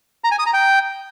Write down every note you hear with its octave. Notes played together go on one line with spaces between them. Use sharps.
A#5
G#5
D#6
A#5
G5